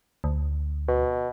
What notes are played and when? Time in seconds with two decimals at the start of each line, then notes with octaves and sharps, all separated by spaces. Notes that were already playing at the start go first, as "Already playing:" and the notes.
0.24 D2
0.88 B2